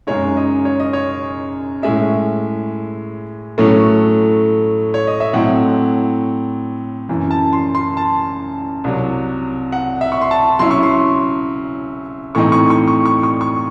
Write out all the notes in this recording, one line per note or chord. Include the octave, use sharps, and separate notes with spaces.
F#2 C#3 G#3 D#4 C#5
D#5
C#5
D#5
C#5
A2 G#3 C#4 E5
A2 F#3 A3 C#4
C#5
D#5
E5
A2 F#3 C4 F#5
F#2 C#3 E3
A5
C6
C6
A5
C2 C3 F#3
F#5
E5
C#6
C6
A5
C#3 F#3 C#4 E4 C6
C#6
C6
A2 E3 C4 D#4 C#6
C#6
C#6
C#6
C#6
C#6
C#6